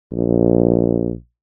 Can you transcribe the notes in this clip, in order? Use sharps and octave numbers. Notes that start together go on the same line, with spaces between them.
A#1